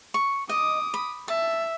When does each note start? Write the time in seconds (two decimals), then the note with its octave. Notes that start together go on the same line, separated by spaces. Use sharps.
0.14 C#6
0.49 D#5 D6 D#6
0.94 B5
1.28 E5 A5